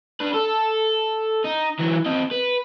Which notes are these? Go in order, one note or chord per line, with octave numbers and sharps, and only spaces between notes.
D4 B4
A4
D#4
E3 F#3
C4 D#5
B4